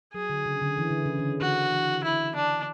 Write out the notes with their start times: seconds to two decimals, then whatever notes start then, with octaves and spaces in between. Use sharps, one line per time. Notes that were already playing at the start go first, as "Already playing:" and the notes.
0.14 F#3 G#4
0.30 D3
0.46 C#3
0.62 D3
0.78 E3
0.91 D3
1.06 C#3
1.19 D3
1.41 D3 F#4
1.72 E3
2.04 E4
2.35 D4